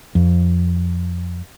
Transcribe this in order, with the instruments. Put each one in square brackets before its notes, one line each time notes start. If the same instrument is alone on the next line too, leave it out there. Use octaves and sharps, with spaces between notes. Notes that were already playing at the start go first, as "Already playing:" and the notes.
[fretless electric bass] F2